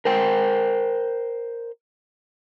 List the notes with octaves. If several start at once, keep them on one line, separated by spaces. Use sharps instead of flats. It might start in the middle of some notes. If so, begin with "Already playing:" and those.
A#4 C5 G5